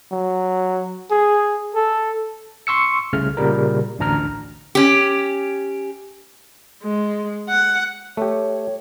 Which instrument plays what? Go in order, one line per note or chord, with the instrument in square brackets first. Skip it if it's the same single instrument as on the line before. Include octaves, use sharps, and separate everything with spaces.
[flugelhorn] F#3
G#4
A4
[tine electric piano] C6 C#6 E6 C#7
C2 C#3 A3 F6
A#2 C#3 G3 A#4
A1 D2 D4 A#5 F6
[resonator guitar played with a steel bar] C#4 G4
[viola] G#3
F#5
[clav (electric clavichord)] A3 G4 [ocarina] C#5